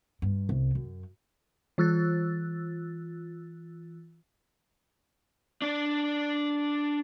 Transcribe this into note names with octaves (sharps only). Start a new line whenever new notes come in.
G2
C2
F#2
E3 F4 E6 F#6 A6
D4 D5